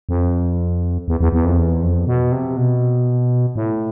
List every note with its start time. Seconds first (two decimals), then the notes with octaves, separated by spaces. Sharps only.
0.09 F2
1.08 E2
1.21 E2
1.33 E2
1.45 F2
1.58 E2
1.82 F2
2.07 B2
2.32 C3
2.57 B2
3.56 A2